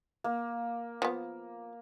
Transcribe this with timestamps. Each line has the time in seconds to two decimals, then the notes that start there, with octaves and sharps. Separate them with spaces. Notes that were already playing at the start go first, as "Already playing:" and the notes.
0.24 A#3
1.02 F3 B3